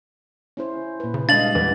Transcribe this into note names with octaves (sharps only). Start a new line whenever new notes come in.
C#4 E4 C5
A#2 B4
C#3
G3 G#3 D4 D#5 F5 A6 F#7
F2 D3 E3